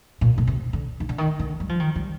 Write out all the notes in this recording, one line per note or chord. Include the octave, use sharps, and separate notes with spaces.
A#2
A#2
C3
D3
D#3
D3
D#3
D3
G3
F3
D#3
G3